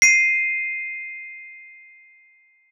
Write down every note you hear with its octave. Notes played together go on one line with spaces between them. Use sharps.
C7 D#7